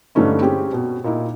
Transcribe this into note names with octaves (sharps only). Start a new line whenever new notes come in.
G2 D3 E3 A3 C#4 D#4
C4 C#4 G4 G#4
B2
A#2 D#4 E4